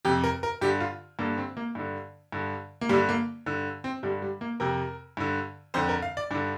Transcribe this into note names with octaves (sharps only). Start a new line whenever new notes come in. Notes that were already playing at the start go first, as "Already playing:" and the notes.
F2 C3 G4
A#4
A#4
G2 D3 G4
F4
G2 D3 A#3
C4
A#3
G2 D3
G2 D3
A#3
G2 D3 G3
A#3
G2 D3
C4
G2 D3 G3
G3
A#3
F2 C3 A#4
G2 D3
F2 D3 C5
A#4
F5
D5
G2 D3 D4